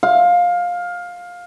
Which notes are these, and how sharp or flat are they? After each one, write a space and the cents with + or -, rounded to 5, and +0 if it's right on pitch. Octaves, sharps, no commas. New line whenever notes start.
F5 +15